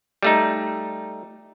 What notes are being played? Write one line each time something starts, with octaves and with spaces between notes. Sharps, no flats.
G3 A3 D#4